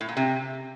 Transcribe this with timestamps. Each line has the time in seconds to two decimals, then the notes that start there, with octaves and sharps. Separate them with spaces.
0.01 A2
0.09 A#2
0.17 C3